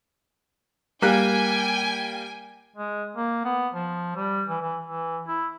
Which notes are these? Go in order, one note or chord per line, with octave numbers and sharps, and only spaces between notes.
G3 A#3 G5 G#5 F#6
G#3
A#3
B3
F3
G3
E3
E3
E3
E4